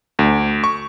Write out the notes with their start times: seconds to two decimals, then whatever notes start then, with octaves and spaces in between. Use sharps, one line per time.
0.19 D2
0.64 C#6